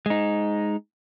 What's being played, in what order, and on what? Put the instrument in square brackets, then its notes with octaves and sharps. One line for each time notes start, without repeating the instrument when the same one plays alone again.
[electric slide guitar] G#3 D#4